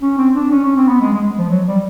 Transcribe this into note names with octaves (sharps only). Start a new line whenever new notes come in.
C#4
C4
D4
C#4
C#4
C4
B3
G#3
G#3
F3
F#3
G3